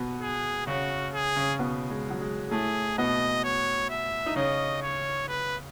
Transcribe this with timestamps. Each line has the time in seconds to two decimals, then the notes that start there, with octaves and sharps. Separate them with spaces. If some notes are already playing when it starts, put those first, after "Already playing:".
Already playing: B2 B3
0.21 G#4
0.67 C#3 C#4 F#4
1.14 G#4
1.36 C#3 C#4
1.59 B2 B3
1.90 G#3
2.10 F#3
2.21 G#3
2.51 A2 A3 G#4
2.98 B2 B3 D#5
3.44 C#5
3.90 E5
4.26 D#4
4.36 C#3 C#4 D#5
4.82 C#5
5.28 B4